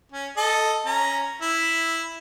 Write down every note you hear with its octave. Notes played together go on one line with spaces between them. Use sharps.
C#4
A4 D#5
C#4 A#5
E4